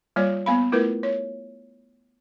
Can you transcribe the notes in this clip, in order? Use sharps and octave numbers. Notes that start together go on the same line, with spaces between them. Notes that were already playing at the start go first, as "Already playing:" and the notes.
G3 A#3 F4 C#5 D5
A#3 B3 F5 B5
A3 E4 F4 A#4 B4
C#5